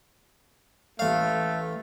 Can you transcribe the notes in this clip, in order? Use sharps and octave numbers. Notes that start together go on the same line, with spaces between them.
A1 A3 F5